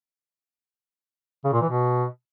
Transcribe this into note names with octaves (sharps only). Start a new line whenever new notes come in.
C#3
A#2
E3
B2